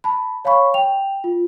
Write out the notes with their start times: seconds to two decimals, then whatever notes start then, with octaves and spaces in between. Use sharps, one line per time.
0.04 A5 B5
0.45 C#5 F5 G#5 B5 C#6
0.74 G5 F7
1.24 F4